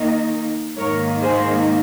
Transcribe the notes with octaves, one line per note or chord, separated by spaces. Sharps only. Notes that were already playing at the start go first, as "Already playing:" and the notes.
Already playing: D#3 A#3 D#4
G#2 D#3 A#3 D#4 A#4 C#5
G#4 C5